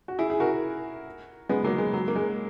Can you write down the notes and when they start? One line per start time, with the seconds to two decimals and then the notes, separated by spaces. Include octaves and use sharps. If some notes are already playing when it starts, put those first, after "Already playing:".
0.08 F#4
0.19 E4 G#4
0.30 G#4
0.40 F#4 A#4
1.49 G#3 B3
1.64 F#3 A#3
1.78 G#3
1.93 F#3
2.08 A#3
2.16 G#3